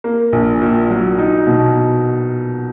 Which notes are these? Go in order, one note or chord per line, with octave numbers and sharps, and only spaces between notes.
A#3
A#1
A#2
F#3
D#4
B2